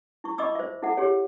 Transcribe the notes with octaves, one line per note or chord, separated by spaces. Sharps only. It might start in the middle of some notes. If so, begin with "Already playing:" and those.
E4 C#6
D#5 B5 C#6 D6 E6
C5 E5
E4 A4 E5 F#5
G4 G#4 C#5